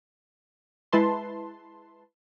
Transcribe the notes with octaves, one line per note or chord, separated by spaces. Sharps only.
G#3 E4 B4 A5 C6